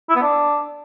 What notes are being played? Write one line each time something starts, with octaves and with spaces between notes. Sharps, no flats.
E4
B3
D4